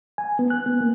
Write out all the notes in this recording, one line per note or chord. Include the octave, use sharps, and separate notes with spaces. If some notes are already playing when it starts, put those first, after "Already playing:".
G#5
B3
F#6
B3
A#3